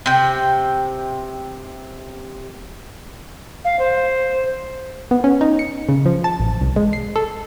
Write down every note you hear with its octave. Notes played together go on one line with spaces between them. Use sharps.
C3 G5
F5
C5
B3
C#4
D#4
C#7
C#3
F3
A5
A1
C2
G#3
C7
A4